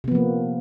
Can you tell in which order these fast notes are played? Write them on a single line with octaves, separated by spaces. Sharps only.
C3 B3 F3 A#3